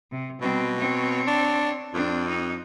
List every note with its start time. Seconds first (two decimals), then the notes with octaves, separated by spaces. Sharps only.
0.11 C3
0.41 B2 G3 C4
0.78 C4 C#5
1.27 D4
1.94 F2 C4 D4
2.28 D#4